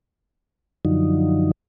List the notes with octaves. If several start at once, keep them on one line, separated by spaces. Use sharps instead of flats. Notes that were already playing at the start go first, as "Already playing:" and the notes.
F#2 D3 F3 F#3 D#4